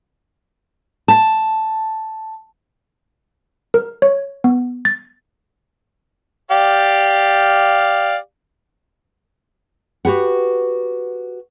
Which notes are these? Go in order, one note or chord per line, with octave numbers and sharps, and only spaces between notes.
A5
A#4
C#5
B3
A6
G4 D5 F5
F#4 G4 B4 F#5